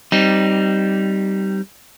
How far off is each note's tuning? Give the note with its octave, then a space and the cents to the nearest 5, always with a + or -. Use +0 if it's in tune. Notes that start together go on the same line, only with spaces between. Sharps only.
G3 -15 C4 +0 D#4 +0